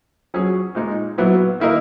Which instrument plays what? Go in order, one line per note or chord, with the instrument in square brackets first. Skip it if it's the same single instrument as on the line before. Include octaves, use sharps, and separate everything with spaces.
[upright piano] F#3 C#4 G#4
A#2 G#3 D#4
A#2 F#3 B3 E4
D#3 A#3 E4 A#4 D#5